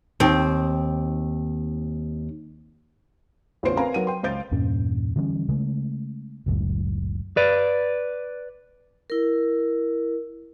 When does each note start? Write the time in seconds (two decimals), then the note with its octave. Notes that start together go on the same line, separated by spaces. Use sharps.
0.20 D#2 C4
3.63 A1 E2 C#3 F4 C5 D7
3.77 C4 A#4 B4 F5 G#5 A#5
3.94 F#3 A#4 B4 F#5 D#7
4.07 G5 C6
4.23 C#2 C5 F5 G6 A6 D7
4.51 E2 G2 A#2 C#4
5.16 D3 E3 G3 C#4
5.49 C#3 G#3 A3
6.46 F#1 C#2 F#2 A2
7.37 B4 D5
9.10 E4 A#4